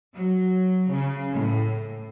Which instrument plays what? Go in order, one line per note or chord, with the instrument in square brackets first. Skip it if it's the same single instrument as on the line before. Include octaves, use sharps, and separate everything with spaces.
[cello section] F#3
C#3
A2